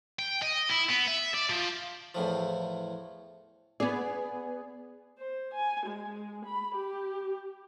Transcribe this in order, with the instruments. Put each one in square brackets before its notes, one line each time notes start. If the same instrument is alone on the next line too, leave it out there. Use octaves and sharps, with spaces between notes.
[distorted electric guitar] G5
D#5
E4
B3
E5
D5
F3
[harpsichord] E2 A2 F3
[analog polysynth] B3 G#4 [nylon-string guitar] D5
[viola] C5
G#5
G#3
B5
G4